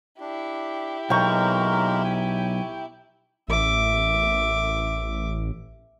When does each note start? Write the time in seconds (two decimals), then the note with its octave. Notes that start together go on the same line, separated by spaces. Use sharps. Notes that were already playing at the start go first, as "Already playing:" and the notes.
0.20 D4 E4 G4
1.10 B1 G#3 A#3 A#4 G5 A#5 C#6
2.04 G#5
3.48 A1 E5 D6